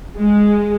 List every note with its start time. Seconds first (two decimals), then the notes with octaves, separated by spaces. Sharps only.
0.17 G#3